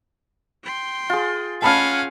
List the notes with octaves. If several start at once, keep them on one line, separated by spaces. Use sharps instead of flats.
G5 C6
F4 G#4
C#4 F5 F#5 G#5 A5 B5 F6